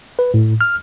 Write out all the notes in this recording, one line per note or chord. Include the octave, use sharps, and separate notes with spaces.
B4
A2
F6